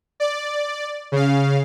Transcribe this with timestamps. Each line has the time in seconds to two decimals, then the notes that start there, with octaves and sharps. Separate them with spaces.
0.20 D5
1.12 C#3 F5